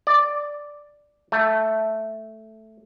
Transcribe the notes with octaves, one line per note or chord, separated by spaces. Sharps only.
D5
A3